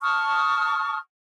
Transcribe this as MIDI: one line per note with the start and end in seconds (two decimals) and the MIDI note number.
0.02 0.98 81
0.02 0.98 85
0.02 0.98 87
0.02 0.98 89